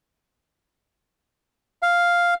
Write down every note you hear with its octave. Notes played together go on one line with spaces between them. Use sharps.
F5